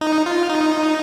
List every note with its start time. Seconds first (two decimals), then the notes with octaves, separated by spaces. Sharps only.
0.01 D#4
0.26 F4
0.49 D#4